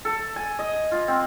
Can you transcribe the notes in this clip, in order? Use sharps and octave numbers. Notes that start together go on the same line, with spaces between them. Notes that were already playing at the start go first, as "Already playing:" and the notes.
A4
G#5
D#5
F4
C4